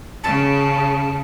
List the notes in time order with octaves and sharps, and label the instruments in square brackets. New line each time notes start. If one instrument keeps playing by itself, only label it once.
[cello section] C#3 [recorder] A5